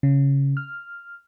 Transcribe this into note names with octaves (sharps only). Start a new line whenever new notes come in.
C#3
F6